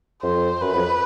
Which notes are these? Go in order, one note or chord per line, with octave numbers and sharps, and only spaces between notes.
F2 C5
F#2 B4
F2